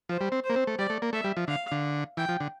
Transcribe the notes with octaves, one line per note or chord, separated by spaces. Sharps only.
F3 C5
G3
C4
C5
A#3
C4
A3
G3 D5
A3
A#3
A3 E5
G3
F3
D3 F5
D3
E3 G5
F3
D3